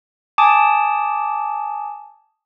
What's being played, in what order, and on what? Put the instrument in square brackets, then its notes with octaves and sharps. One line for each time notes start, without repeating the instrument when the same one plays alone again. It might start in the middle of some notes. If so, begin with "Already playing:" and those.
[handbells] G#5 A5 D6 D#6